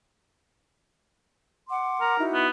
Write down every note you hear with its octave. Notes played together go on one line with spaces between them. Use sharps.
F#5 C6 D6
A#4
D#4 E4 F#4
B3